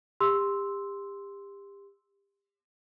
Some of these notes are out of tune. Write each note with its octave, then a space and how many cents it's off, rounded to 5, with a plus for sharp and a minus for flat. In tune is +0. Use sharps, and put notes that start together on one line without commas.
G4 +30 C6 +0 E6 -10